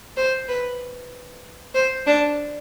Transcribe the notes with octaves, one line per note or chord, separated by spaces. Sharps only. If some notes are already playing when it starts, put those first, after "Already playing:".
C5
B4
C5
D4